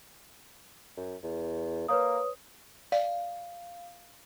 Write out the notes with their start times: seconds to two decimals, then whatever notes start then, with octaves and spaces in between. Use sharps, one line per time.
0.97 F#2
1.23 E2
1.88 A#3 B4 C#5 D#6
2.92 D5 F5